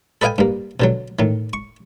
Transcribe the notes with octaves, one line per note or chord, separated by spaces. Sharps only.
A4 B4 D#5 F5 G5 G#5
G2 A#3
B2 D3 F#3
A2 D#3
C#6